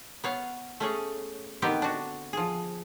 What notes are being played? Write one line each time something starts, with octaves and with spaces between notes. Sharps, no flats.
B3 C#5 F5
A3 C#4 G#4 C#5
D3 D#3 B3 C4 G4 B4
D4 F#4
F3 G#4